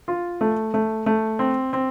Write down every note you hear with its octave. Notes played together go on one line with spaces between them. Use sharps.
F4
A3
A3
A3
C4
C4